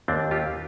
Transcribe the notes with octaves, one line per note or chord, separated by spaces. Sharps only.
D#2 C4 D4
F4 G4